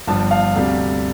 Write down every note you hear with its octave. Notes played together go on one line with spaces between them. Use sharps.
G1 G2 F3 A5
F5
D2 C3 G3